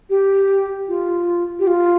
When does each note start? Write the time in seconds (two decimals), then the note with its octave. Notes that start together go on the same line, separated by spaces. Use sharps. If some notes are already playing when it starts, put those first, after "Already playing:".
0.10 G4
0.88 F4
1.59 G4
1.67 F4